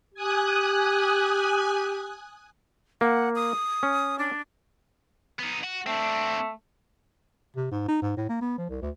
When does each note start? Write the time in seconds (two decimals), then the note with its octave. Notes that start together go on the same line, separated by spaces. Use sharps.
0.14 G4 G#5 D#6 F#6
3.01 A#3 F#5
3.36 D#6
3.83 C#4
4.19 D4
5.39 B3 D#4
5.64 F#4
5.87 A3 C4 D4
7.56 C3
7.71 G#2
7.88 D#4
8.02 G#2
8.17 A2
8.29 A#3
8.41 B3
8.58 F3
8.69 C2
8.82 D2